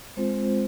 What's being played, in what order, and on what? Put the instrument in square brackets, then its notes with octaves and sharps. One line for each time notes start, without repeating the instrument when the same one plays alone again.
[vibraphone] G#3 C4 F4 C5